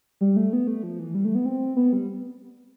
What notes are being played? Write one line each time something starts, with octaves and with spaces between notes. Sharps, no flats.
G3
A3
B3
A3
F3
E3
G3
A3
B3
C4
B3
G3